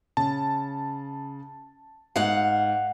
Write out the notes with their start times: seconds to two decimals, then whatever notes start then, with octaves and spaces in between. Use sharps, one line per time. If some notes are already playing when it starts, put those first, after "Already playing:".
0.17 C#3 A5
2.16 G#2 F5 F#5